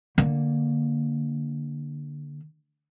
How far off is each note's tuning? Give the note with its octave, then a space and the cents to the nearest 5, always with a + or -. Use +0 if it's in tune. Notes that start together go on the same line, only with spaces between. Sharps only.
D3 +0 A#3 +0